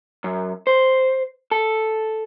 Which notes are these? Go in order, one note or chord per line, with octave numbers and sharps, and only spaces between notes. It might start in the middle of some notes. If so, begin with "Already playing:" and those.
F#2
C5
A4